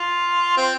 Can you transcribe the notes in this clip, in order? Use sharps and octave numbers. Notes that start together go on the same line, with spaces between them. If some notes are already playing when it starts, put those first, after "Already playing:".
Already playing: F4
C4